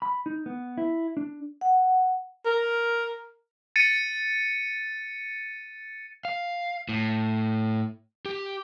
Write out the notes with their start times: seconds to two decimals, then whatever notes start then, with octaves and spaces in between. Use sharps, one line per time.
0.02 B5
0.26 D#4
0.46 B3
0.78 E4
1.17 D4
1.61 F#5
2.46 A#4
3.76 A6 C#7 D#7
6.25 F5
6.89 A2
8.26 G4